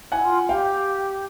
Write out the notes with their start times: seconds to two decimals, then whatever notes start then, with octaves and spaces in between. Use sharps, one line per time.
0.12 E4 F#5 G#5
0.24 F4
0.49 G4 F5 G5